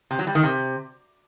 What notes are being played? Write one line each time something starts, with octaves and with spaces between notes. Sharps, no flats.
C3
F#3
G3
D#3
C3